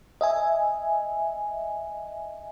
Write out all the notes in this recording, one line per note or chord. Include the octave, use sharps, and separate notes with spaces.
D#5 E5 G#5